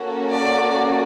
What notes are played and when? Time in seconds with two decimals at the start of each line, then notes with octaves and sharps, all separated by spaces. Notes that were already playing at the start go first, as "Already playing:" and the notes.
Already playing: A#3 C#4 F#4 A4
0.32 D5